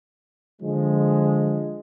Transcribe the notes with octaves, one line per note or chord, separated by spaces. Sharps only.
D3 F3 G#3